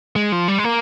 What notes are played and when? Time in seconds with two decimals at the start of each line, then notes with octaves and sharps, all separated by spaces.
0.16 G#3
0.32 F3
0.48 G3
0.58 G#3
0.64 A#3